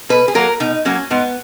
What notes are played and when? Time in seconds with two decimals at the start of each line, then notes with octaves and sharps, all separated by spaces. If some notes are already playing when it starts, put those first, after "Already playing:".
0.09 B2 B4
0.28 G#4
0.35 F#3 A#3 A#4
0.60 B2 D#4
0.85 F#3 A#3 C#4
1.10 G#2 B3